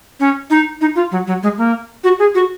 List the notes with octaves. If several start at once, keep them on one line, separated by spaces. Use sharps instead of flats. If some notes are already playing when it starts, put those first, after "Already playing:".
C#4
D#4
D#4
F4
F#3
F#3
G#3
A#3
F#4
G#4
F#4